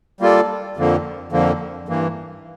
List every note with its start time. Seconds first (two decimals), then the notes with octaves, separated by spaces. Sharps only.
0.21 G3 A#3 F4 A4 D5
0.77 F2 D3 F3 A#3
1.32 F2 D3 F3 A#3
1.88 G2 E3 A#3